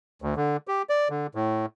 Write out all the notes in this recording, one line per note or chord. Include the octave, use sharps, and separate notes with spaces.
D2
D3
G4
D5
D3
A2